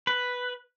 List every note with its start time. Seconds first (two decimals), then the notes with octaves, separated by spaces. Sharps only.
0.07 B4